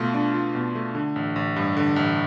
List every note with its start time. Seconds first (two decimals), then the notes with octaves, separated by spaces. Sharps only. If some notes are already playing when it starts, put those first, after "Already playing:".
Already playing: B2 A3 F4
0.14 D4
0.34 F4
0.55 B2
0.75 A3
0.95 D3
1.16 A1
1.36 A1
1.56 G2
1.77 D3
1.96 A1